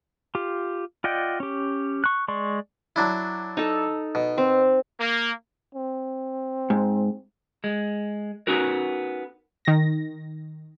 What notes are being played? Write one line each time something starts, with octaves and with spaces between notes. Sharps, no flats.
F4 G4
F4 D5 D#5 F#5 G5
C#4 G4
C#6 F#6
G#3 D5 C6 C#6
F#3 D4 E4
D#4 A4
B2
C4
A#3
C4
G#2
G#3
B3 C#4 D#4 F#4 A#4
D#3 A#6